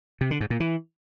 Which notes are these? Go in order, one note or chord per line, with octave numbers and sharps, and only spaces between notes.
C3
D3
G#2
A#2
E3